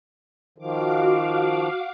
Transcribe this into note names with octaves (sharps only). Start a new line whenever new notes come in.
D#3 F3 F#4 F5 D6